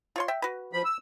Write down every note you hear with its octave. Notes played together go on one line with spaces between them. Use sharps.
F4 C#5 C6
E5 G5
F#4 B4
F3 B5
E6